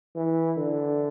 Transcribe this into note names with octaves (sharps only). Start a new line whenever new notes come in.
E3
D3